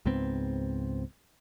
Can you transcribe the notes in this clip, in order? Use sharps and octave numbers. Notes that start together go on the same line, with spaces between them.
C#2 G#2 B3 C4